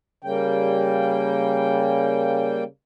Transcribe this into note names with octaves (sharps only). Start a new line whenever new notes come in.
C#3 G3 A#3 G5